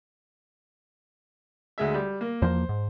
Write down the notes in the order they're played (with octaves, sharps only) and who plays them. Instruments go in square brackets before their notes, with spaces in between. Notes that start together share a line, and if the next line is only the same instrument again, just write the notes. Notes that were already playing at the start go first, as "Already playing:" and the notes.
[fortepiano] D2 G#3 E5
G3
A#3
[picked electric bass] E2 F3 A#3 [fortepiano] C5
[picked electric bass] G#2